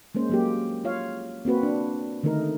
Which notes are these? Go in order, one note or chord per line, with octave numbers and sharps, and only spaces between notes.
G#3 A#3 C#4 C5
F#3 A#3 G4
F4 C#5 F5
A#3 C4 F#4 B4
D4
D3 D#3 A3 D#4 A#4